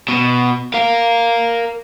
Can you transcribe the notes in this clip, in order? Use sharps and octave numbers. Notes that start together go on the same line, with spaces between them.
B2
A#4 F5